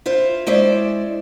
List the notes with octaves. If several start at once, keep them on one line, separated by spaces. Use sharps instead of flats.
E4 F4 C5
G#3 C#4 E4 C5 D5